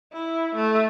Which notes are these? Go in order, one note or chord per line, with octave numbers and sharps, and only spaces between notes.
E4
A3